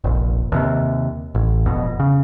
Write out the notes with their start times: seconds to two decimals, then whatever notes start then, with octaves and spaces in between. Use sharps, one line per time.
0.04 F1 A#1
0.52 D#2 C3
1.35 A1
1.66 E1 F2 B2
2.00 C#3